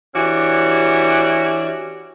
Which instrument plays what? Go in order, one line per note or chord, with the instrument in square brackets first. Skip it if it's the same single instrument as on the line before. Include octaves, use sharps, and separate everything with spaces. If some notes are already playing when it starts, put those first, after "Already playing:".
[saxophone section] E3 C#4 D4 F#4 G4